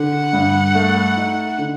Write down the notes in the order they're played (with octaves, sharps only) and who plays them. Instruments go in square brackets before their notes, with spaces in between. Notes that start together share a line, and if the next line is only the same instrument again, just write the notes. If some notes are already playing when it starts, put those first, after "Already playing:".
Already playing: [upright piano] D3 [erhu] F#5
[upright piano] G2
A3
D#4
D3